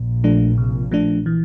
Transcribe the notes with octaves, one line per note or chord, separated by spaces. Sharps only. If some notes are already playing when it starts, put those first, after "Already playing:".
Already playing: A#1 A#2
F3 A3 D4
C3
F3 A3 D4
E3